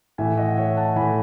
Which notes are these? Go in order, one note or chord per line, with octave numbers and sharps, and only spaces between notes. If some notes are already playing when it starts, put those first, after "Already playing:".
A2 E3 E5 G#5
D#5 F#5
C#5 E5
F#5 A5
A2 E3 G#5 B5